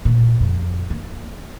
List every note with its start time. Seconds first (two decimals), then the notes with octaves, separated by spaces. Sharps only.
0.05 A#2
0.40 F2
0.90 A#3